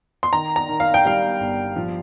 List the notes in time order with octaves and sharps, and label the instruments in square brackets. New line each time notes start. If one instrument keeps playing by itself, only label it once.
[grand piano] C6
D#3 A#5
A#5
D#3
F5
G5
G3 F5
G1
F3